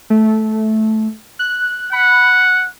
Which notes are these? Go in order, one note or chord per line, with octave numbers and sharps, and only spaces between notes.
A3
F#6
F#5 B5